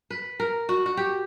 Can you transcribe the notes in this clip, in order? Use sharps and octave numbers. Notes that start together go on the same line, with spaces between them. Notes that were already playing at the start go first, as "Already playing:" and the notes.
B4
A#4
F#4
F#4
G4